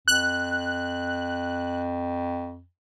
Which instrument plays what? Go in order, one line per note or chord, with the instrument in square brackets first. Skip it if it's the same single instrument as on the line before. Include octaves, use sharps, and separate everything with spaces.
[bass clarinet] F2 [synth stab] F#6